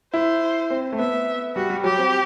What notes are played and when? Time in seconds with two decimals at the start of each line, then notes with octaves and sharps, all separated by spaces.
0.14 E4 C5
0.70 C4
0.93 A3
0.99 B3 E5
1.56 G3 F#4
1.70 G3
1.84 F#3 G4
1.98 C4